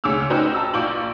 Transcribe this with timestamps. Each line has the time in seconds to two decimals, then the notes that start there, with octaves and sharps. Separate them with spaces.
0.04 D2 C#3 D6 E6 F6
0.30 D#4 F#4 G4 B4 C5 D#5
0.54 A5 A#5 E6
0.74 A#1 F4 C#6 D6 G6 F#7